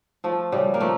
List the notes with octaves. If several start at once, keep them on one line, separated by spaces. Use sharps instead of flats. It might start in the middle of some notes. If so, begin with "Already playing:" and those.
F3 A3
C#3 G3
A#3
F3 A3